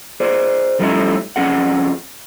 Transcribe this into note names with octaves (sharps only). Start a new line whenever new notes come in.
G#4 C5 D5
F3 G3 A3 C#4 D#4 E4
F2 C#4 G#4 F#5